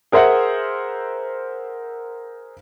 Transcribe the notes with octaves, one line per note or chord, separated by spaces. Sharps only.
G#4 A#4 C5 E5 F#5